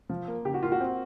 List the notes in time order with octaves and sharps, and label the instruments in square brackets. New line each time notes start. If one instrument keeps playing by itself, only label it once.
[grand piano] F3
A#3
[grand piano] C#3 [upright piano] G4
[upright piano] F#4
[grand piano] A#3 [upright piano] F4
[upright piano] F#4
[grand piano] C4